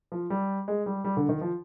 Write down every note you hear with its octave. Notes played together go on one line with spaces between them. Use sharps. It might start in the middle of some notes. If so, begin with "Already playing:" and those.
F3
G3
G#3
G3
G3
D3
D#3
F3